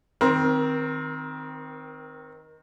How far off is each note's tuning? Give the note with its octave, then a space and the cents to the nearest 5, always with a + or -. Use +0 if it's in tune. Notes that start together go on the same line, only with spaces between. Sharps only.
D#3 +0 C4 +0 A#4 +30